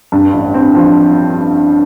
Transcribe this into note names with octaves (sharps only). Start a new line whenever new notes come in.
G2
A1
C4
F3